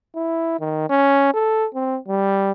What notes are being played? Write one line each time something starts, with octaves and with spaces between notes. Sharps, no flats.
E4
D#3
C#4
A4
C4
G3